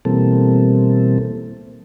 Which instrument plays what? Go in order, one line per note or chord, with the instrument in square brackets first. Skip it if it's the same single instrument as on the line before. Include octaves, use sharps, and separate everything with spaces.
[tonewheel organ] B2 E3 G3 A#3 C4 A4